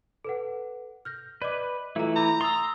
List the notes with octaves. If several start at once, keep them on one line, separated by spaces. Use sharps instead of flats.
A4 B4 F#5
F6 G6 A#6
B4 D5 D#5 D6
E3 A3 E4 F4 A4 A#5
A#5 B5 D6 G6
C6 D#6 E6 A6 F7